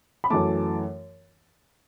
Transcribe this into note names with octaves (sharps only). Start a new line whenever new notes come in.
B5
F#2 E3 A3 A5 D6